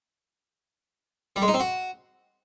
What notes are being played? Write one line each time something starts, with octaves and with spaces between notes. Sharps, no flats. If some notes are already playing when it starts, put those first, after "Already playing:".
G3
G#3
D#4
C4
F#4